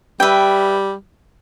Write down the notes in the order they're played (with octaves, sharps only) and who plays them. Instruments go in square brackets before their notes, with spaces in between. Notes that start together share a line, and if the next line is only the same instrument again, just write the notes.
[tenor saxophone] G3 [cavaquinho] B4 E5 G5